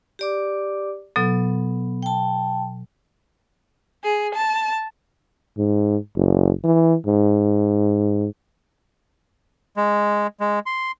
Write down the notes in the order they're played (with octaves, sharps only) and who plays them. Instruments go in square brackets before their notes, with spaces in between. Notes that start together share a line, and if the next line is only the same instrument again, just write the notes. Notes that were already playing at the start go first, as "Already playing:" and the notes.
[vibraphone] G4 D5 D6
[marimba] B2 F#3 A4 [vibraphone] B3
[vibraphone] G5 A5
[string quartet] G#4
A5
[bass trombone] G#2
F#1
E3
G#2
[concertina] G#3
G#3
C6